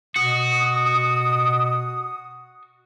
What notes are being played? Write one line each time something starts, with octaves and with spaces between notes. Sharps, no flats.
B2 F#4 D#6